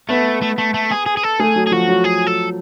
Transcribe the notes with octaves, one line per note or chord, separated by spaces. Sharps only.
A3 B3
A3
A3
A3
G#4
G#4
G#4
A4
A3 G#4
F#3
G#4
F3 F#4
F#3
G#4
A4